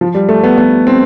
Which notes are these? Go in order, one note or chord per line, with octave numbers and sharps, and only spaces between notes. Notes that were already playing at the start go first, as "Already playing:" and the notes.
F3
G3
A3
B3
B3
C4